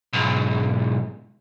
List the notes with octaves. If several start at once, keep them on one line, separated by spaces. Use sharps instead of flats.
B1 G#2